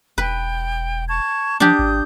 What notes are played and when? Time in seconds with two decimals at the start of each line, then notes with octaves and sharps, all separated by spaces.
0.18 E1 B4 G5
1.09 A5 C#6 G#6
1.60 F3 D4 G4 D#6 G6
1.79 G#1